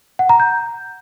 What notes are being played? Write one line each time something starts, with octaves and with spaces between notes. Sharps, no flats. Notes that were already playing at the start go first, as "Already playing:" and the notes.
F#5
A#5
G6